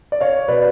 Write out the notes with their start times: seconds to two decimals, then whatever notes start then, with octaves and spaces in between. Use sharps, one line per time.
0.12 D5
0.21 C#5 F5
0.48 B2 B4 D5